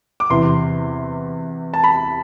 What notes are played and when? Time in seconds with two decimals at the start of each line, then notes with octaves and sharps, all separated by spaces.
0.20 D6
0.30 E2 C3 E3 C6
1.74 A5
1.84 B5